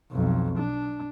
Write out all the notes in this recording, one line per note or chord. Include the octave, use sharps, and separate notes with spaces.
B1 F2
D4